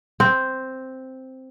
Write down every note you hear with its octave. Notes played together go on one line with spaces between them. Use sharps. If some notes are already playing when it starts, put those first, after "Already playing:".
C4